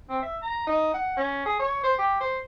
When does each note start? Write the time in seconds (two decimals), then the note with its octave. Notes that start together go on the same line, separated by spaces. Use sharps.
0.09 C4
0.22 E5
0.42 A#5
0.67 D#4
0.94 F#5
1.17 C#4
1.46 G#4
1.59 C#5
1.83 C5
1.98 G4
2.20 C5